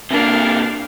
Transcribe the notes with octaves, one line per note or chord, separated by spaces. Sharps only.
C3 A#3 D4 F5